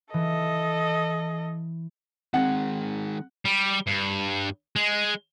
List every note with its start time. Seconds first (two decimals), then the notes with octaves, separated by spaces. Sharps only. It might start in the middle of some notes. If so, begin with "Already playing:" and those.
0.14 E3 A4 D#5
2.34 D#3 G#3 C4 F#5
3.45 G3
3.87 G2
4.76 G#3